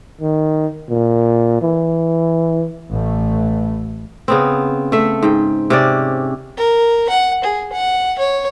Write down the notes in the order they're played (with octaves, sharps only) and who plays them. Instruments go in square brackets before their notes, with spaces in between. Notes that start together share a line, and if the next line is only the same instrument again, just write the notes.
[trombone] D#3
A#2
E3
[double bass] A1 A3
[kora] C#3 B3 C4
A3 E5
G#2 G5
C3 C#4 D5
[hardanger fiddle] A#4
F#5
G#4
F#5
C#5